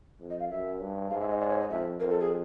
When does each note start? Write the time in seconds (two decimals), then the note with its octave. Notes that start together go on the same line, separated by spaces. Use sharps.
0.20 F2
0.30 D#5
0.40 F5
0.49 F#2 E5
0.80 G2
1.10 G#2 F5
1.20 E5
1.30 D#5
1.40 D5
1.50 C#5
1.60 D#5
1.70 F2 E5
2.00 F2 A#4
2.10 A4
2.21 G#4